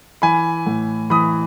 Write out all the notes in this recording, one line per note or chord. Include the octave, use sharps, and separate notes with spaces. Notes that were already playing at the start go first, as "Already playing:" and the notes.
E3 G#5 B5
A2
E3 B5 D#6